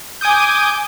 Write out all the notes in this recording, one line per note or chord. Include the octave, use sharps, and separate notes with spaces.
G#5 D6 D#6 G6